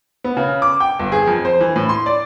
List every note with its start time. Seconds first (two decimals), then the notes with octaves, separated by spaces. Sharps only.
0.24 B3
0.37 C#3
0.62 D6
0.80 G5
0.99 G1
1.12 G#4
1.27 F2
1.45 C5
1.61 E3
1.76 A2
1.89 C6
2.06 D5